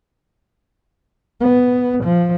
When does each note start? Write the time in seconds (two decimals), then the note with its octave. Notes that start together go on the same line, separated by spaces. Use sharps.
1.40 B3
2.04 F3